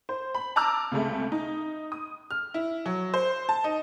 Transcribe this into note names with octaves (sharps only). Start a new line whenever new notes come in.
C5
B5
A5 A#5 D6 E6 F6
C#2 C3 G#3 A3
D#4
D#6
F6
E4
F#3
C5
A5
D#4